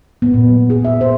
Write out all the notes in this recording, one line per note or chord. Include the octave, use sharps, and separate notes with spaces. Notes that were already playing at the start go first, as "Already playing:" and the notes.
B3
A#2
F#3
G#4
E5
C5